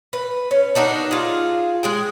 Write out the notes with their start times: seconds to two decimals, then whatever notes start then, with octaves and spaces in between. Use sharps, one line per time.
0.13 B4
0.51 C#4
0.75 D4 D#4 F#4 A#4
1.11 F4 G#4
1.83 G#3 G#4 G5